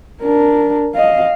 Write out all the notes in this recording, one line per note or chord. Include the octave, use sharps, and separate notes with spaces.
D4 A#4
D#5 F5